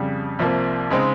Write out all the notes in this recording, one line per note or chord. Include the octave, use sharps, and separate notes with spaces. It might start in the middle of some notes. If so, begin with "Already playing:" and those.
Already playing: F2 C#3 G3
C2 C3 F3 A#3
C#3 G#3 C4 D#4